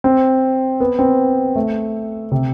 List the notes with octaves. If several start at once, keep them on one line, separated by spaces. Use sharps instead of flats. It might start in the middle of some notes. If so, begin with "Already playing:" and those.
C4
B3
C4
A3
C3